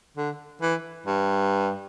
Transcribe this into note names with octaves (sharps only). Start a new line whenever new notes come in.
D3
E3
G2